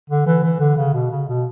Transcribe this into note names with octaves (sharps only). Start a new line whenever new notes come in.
D3
E3
E3
D3
C#3
B2
C#3
B2